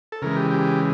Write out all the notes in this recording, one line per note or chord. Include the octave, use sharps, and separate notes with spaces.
A4
C#3 E3 G#3 A#4
G4
G4